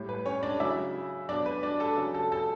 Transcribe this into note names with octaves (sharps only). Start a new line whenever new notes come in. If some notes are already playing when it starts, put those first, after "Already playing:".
Already playing: A2 G3
B4
C#4 C#5
D4 D5
C#3 F#3 E4 E5
B2 F#3 D4 D5
B4
D4 D5
A4 A5
C#3 F#3
A4 A5
A4 A5